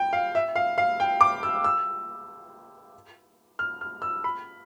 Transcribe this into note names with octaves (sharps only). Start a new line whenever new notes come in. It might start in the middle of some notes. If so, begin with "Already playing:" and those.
Already playing: G5
F5
E5
F5
F5
G5
D6
E6
E6
F6
F6
E6
B5